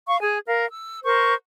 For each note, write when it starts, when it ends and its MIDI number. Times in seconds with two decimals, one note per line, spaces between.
0.08 0.20 77
0.08 0.20 85
0.21 0.39 68
0.21 0.39 80
0.46 0.66 70
0.46 0.66 77
0.71 1.00 88
1.03 1.34 70
1.03 1.34 72
1.03 1.34 85